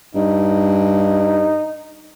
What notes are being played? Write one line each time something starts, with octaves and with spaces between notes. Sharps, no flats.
G2 D#4